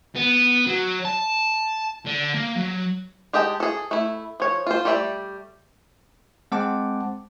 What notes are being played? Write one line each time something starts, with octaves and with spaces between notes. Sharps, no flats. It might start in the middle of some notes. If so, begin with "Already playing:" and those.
B3
F#3
A5
D3
A#3
F#3
G#3 G4 D#5 G5 A5
G#4 A4
A3 E4
F3 C#5
F4 C5
G3 A3 D5 E5 A5
G#3 C4 C5 F#5 A5 D6